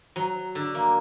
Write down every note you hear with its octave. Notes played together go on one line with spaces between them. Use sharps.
F#3
D3
A#3